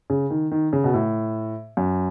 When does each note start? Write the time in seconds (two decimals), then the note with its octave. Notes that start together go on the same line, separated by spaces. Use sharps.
0.10 C#3
0.30 D#3
0.51 D#3
0.73 C#3
0.84 B2
0.94 A2
1.77 F#2